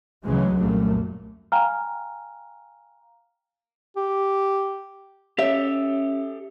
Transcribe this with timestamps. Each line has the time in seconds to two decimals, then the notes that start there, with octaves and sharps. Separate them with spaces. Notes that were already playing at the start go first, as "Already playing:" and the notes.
0.25 D2 C#3 E3 F#3 G#3
0.56 C2 F#2 A#2 A3 A#3
1.52 F5 G5 G#5 A#5 F6
3.96 G4
5.38 C#4 G4 A4 E5